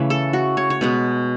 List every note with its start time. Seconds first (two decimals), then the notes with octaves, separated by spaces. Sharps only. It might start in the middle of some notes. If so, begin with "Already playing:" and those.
Already playing: C#3 E3 A3 B4
0.10 A4
0.33 F#4
0.57 C#5
0.70 C#5
0.81 B2 G#3 B3 B4